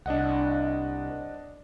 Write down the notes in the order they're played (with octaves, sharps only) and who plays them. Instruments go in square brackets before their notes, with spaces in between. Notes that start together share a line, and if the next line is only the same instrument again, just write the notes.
[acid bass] C2 [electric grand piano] D4 D#5 F#5